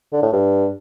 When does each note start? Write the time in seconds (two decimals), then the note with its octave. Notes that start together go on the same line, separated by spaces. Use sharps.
0.13 D3
0.23 A2
0.33 G2